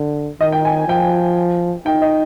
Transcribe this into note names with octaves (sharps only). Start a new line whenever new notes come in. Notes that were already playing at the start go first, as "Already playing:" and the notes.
Already playing: D3
D#3 D#5
G5
G#5
F3 G5
D#4 G5
D#5